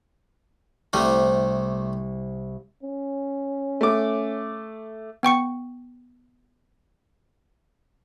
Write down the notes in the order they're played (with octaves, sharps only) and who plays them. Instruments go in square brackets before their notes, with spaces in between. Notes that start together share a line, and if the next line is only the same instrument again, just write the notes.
[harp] C2 [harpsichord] C3 G3 A3
[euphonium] C#4
[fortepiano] A3 D6
[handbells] B3 G5 C#6 C#7